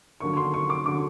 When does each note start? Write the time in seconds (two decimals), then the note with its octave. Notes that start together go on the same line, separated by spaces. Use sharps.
0.20 D#2 D3 F#3 C#6
0.37 C6
0.54 C#6
0.70 D6
0.86 D3 F#3 D6